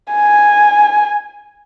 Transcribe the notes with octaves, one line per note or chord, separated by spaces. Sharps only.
G#5